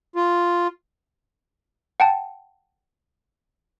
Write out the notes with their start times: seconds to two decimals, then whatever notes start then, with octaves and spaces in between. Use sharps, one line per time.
0.16 F4
2.00 F#5 G5 A5